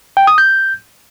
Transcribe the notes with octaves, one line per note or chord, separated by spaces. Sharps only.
G5
D#6
G6